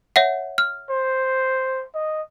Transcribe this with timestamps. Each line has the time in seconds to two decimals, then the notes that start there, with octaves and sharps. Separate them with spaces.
0.16 C#5 E5 F#5
0.58 F6
0.90 C5
1.94 D#5